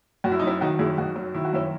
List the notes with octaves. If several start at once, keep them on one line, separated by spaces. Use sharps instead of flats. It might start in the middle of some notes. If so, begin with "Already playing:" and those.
F#2 F#4
E4
D#4
F#3 C#4 E4
D#3 D#4 F#4
F#2 E4 G#4
F#2 D#4 F#4
F#3
D#3 E4
F#4
F#2 C#4 E4